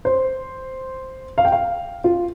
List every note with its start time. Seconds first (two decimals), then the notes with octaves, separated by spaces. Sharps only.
0.05 C5
1.38 F5
1.45 G5
1.52 F5
2.04 F4